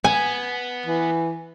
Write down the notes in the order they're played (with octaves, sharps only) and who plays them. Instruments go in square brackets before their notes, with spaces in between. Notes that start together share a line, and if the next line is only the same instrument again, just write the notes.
[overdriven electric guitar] B3 [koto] G#5
[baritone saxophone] E3